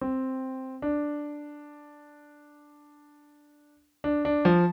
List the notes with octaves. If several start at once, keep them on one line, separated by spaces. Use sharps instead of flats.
C4
D4
D4
D4
F3